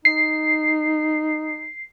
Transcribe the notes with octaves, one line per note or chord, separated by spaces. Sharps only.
D#4 C7